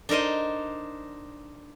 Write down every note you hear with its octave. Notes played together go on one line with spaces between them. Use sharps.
D4 D#4 A#4 C5 D#5